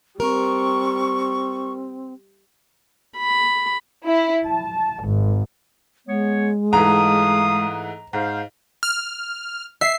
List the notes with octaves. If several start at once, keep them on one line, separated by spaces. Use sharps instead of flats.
G3 C4 A#4 C#6
B5
E4
A5
G#1
G#3 B3 C#5
G#2 E3 A3 F5 A#5 D#6
G#2 C5 F5
F6
E5 C7